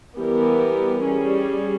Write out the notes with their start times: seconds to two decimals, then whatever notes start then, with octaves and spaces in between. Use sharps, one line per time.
0.18 E3 G3 B3 G4 A#4
1.04 G3 C#4 G#4